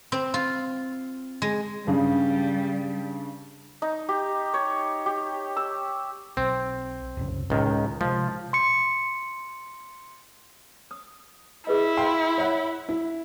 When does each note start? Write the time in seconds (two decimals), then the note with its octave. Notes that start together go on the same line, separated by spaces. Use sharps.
0.12 C4
0.34 F4
1.42 G#3
1.87 G2 C#3 G3
3.82 D#4
4.09 G4
4.54 C#5
5.06 G4
5.57 E6
6.37 B1 C4
7.17 C2 F#2 C#3
7.50 C#2 A2 D#3
8.01 C3 F3 G#3
8.53 C6 C#7
10.91 D#6
11.67 E4 G#4 B4 D#5
11.97 F5 G5 C6
12.38 C#5 E5 F#5
12.89 E4